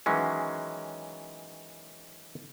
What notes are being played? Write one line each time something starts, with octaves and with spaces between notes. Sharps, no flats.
D#3 E3 F#3 G#3 C#4